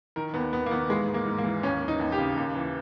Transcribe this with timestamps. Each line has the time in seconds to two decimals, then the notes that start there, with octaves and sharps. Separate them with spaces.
0.16 D#3 A#4
0.34 D#2 B3
0.53 D#2 B3
0.66 A#3
0.71 D#3 B3
0.90 E3 G#3
1.08 G#2
1.14 A#3
1.26 G#2
1.38 A#3
1.44 E3
1.63 D#2 C#4
1.81 E3
1.88 D#4
2.00 D#2
2.12 G4
2.18 C#3
2.36 D#2
2.55 E3